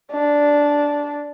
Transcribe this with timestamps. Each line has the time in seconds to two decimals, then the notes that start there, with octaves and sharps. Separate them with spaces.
0.12 D4